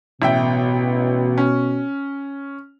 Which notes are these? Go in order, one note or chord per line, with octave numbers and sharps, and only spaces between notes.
A1 B2 E5 G5
C#4